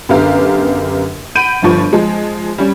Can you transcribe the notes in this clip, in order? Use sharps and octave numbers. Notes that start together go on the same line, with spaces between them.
F#2 D3 B3 G4 F5 A#5
F#5 B5 G6 D7 D#7
G1 G2 F3 C#6
F3 G#3
G3 C#4